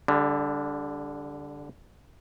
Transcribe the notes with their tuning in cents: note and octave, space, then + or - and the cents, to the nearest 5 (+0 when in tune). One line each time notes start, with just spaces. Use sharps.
D3 -10 G3 +25